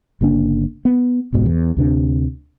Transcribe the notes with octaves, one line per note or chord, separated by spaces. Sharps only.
G1 C#3 A#3 D4
B3
F1 A#1 G#2 B2
E2
D2 C3 D4